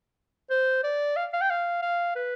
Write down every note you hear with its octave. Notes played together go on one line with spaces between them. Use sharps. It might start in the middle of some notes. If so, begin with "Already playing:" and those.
C5
D5
F5
F5
G5
F5
F5
B4